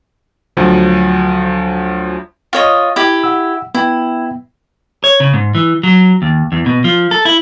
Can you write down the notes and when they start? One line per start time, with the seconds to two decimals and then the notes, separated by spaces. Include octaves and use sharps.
0.57 D2 F3 F#3
2.53 F4 C#5 D#5
2.96 E4 G4
3.24 F#5 E6
3.75 B3 E4 G5
5.04 C#5
5.20 C#3
5.33 G#2
5.55 E3
5.83 F#3
6.22 D#2
6.52 E2
6.66 B2
6.84 F3
7.11 A4
7.25 E4